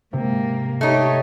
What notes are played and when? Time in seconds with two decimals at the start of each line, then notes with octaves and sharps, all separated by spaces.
0.13 G#2 C3 A#3
0.81 A3 D#4 G4 C#5